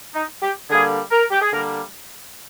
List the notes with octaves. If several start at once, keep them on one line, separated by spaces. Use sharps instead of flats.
D#4
G4
D3 G3 A#3 G#4
A#4
G4
G#4
D3 G3 A#3 A#4